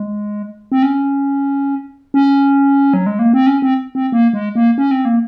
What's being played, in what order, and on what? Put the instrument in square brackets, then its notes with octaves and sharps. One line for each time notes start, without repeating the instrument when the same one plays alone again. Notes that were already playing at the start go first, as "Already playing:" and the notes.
Already playing: [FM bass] G#3
C4
C#4
C#4
F#3
G#3
A#3
C4
C#4
C4
C4
A#3
G#3
A#3
C#4
C4
A#3